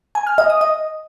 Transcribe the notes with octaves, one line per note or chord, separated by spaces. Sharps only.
G#5
F6
D#5
D#6
D#5